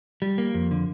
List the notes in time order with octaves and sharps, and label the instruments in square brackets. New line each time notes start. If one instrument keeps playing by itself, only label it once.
[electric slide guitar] G3
A#3
F2
D3